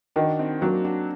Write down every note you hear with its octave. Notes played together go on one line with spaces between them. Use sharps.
D#3 D4 F#4
C4 D#4
F#3 A#3 D4
D4 F#4